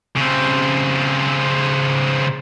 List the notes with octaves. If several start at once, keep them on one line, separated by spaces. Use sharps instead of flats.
C#3 C4